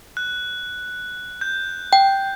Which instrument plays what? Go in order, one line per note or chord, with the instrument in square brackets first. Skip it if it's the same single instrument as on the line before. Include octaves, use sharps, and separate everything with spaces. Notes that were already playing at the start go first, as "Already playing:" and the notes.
[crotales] F#6
G6
[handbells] G5